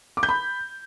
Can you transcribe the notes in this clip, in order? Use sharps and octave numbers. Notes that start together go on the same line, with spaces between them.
D6
G6
B5